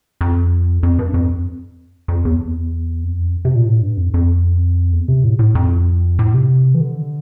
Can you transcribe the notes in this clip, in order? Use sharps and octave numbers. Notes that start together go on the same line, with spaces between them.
F2
F2
G2
F2
F2
E2
F2
C3
A#2
A2
G2
F2
F2
E2
C3
A2
A2
F2
A2
C3
E3
D3